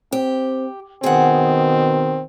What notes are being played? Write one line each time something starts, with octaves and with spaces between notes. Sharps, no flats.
C4 G4
B2 D#3 C4 G#4 F#5